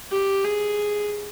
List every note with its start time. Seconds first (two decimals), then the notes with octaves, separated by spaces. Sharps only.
0.11 G4
0.44 G#4